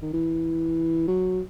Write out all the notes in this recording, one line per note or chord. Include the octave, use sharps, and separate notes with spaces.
D#3
E3
F#3